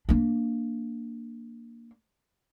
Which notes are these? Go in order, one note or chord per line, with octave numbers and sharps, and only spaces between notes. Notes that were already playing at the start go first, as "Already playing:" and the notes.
A#3 D4